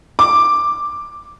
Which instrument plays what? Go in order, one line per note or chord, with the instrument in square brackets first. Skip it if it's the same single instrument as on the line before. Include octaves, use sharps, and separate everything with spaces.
[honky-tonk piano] D6